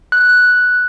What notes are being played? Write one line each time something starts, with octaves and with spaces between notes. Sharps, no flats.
F#6